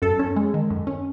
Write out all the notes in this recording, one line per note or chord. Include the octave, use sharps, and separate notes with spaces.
F#2 A4
C#4
G#3
D#3
F#2
C#4